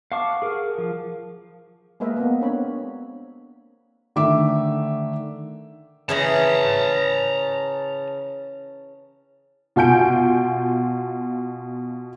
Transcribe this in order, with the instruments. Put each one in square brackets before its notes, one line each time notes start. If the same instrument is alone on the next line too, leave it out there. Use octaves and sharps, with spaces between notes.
[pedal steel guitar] F5 F#5 A5 C#6 D6
G#4 A#4
F3
[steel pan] G#3 A#3 A#4 B4 D#5 E5
A#3 B3
C4 D4 C#5 B5
[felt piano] D3 D#3 A3 E5 D6
[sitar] C#3 [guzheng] E3 G#4 D#5 [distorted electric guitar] A5 A#5
[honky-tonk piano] B2 F4 G#5 G6 D7